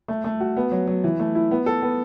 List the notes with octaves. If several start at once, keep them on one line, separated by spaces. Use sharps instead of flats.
A3
A3
F#4
B3
F#3
F#3
E3
A3
E4
B3
A4
B3